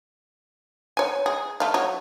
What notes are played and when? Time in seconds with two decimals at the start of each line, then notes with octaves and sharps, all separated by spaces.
0.97 C#5 G#5
1.26 G#4
1.60 A3 F5
1.74 F#3 C#5